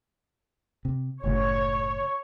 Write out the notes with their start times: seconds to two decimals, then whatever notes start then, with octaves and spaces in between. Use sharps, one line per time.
0.85 C3
1.24 F#1 A2 C#3 C#5